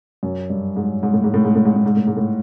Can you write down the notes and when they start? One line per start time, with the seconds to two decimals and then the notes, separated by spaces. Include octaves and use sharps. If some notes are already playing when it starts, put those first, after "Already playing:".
0.23 F#2
0.50 G2
0.76 G#2
1.03 G#2
1.14 A2
1.24 G#2
1.34 A2
1.45 G#2
1.55 A2
1.65 G#2
1.76 A2
1.86 G#2
1.97 A2
2.07 G#2
2.17 A2